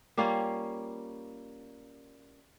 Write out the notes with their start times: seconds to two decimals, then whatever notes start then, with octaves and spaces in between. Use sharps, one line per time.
0.18 G3 A#3 C#4 F4